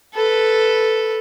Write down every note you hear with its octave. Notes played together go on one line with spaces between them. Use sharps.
A4 B4